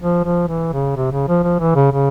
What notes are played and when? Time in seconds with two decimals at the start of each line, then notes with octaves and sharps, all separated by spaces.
0.01 F3
0.25 F3
0.48 E3
0.73 C#3
0.97 C3
1.11 C#3
1.28 F3
1.43 F3
1.60 E3
1.75 C#3
1.92 C#3